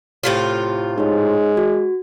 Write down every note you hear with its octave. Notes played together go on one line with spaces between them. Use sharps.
A2 C3 F4
G#3 D#4 C#5
F#4